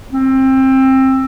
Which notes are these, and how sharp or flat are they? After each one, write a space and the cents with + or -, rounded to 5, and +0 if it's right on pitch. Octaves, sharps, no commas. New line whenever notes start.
C4 +20